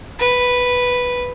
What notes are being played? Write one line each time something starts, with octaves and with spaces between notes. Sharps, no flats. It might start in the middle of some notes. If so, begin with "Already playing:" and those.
B4